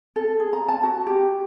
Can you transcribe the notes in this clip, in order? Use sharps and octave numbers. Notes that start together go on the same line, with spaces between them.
A4
G#4
A#5
A5
F#4
G4